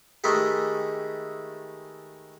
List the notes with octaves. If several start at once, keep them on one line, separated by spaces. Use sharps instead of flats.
D#3 G#3 A3 E4 G4 G#4